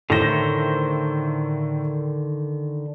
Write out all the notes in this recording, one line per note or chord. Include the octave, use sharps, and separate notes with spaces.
A2 D3 D#3 C5 A#6